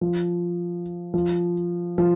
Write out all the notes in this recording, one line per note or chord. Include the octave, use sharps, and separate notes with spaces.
F3
F3
F3